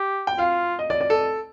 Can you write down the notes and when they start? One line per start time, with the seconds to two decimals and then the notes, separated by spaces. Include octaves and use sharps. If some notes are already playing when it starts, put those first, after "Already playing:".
Already playing: G4
0.27 G5
0.38 F4 F5
0.79 D#5
0.90 D5
1.01 D5
1.10 A4